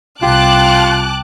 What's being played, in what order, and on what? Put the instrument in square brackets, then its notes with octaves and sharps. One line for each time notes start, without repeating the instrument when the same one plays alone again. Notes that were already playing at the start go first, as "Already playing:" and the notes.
[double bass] C2 C3 [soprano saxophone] F4 [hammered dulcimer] G4 [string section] A5 D6 F#6